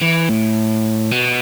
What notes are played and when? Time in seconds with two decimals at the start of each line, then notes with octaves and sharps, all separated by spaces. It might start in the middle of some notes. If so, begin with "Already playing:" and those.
0.02 E3
0.29 A2
1.11 B2